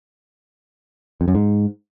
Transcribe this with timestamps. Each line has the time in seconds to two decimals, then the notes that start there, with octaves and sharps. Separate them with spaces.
1.21 F2
1.28 F#2
1.35 G#2